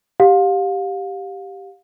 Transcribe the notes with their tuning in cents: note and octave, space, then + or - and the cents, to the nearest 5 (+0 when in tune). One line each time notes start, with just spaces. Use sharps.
G4 +0 F5 +30